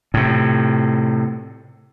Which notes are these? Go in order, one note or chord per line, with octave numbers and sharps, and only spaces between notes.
A2 C3